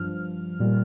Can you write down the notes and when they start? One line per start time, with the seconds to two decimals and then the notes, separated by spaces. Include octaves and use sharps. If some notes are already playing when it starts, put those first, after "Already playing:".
Already playing: G2 F3 F6
0.60 A#2 G3